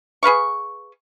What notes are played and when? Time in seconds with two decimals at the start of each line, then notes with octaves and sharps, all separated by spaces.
0.23 G#4 B4 F5 C#6